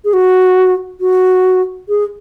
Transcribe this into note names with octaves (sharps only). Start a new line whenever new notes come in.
G#4
F#4
F#4
G#4